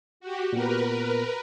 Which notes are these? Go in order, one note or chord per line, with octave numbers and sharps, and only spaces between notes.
F#4 G4
A#2 B3 A#4 B4